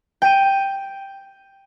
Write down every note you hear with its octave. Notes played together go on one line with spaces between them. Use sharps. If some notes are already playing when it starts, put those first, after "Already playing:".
G5 D#7